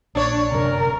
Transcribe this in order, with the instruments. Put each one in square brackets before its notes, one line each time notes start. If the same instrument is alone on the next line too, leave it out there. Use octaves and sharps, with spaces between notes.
[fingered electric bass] A#1 [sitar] D4 C#5
[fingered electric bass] D1 F#2 C3 [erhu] A#4